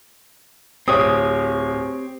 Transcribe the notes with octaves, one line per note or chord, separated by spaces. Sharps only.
D1 C4 G4 C#5 D#6